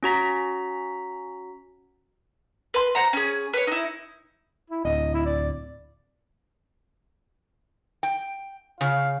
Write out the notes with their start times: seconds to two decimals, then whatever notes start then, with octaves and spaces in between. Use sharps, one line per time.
0.03 C#4 F#4 A#5 B6
2.74 B4 C6
2.95 C5 F#5 A#5
3.13 C#4 G#4
3.53 B4 C#5
3.67 D#4 E4
4.70 E4
4.85 D1 D#5
5.14 E4
5.26 D5
8.03 G5
8.81 C#3 F5